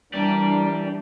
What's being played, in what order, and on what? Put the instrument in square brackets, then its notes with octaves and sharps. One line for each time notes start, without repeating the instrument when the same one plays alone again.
[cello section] E3 G3 D4 [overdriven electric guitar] G4 D5 [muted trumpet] A#4